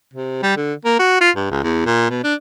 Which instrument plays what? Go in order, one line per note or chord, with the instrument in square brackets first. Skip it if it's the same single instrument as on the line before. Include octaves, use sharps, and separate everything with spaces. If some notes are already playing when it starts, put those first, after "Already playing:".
[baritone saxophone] C3
G3
D3
A#3
F#4
F4
G2
C#2
E2
A#2
B2
D4